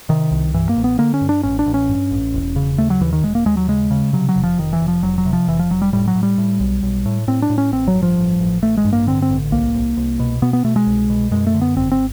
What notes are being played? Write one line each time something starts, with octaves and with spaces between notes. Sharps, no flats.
C3 D#3
C2
G2 E3
A#3
A1
B3
D3 A#3
C#4
G2
D4
A1 C#4
D4
A1
C#4
G2
A1
E1
C#3
D#2 A3
F#3
D#2 E3
D#3
E1 G#3
A#3
D#2 G#3
F#3
C#3 G#3
C#3
C3 F#3
F#3
F1
F3
F1 D#3
E3
F1
F3
F1 F#3
F#3
C3
F3
F1 E3
F3
F1 F#3
G3
A2 G3
F#3
A2
G3
A2
B1
B1
A2
A2 C4
D4
A2
C#4
A1 C4
F#3
G2
F3
A1
A1
A1 A3
G#3
G2
A#3
D3 C4
C4
A1
C2 A#3
C2
C2
B2
B2 B3
B3
B2 A3
G#3
C2
B2
F#2 G#3
A3
D3
B3
G#1 C4
C4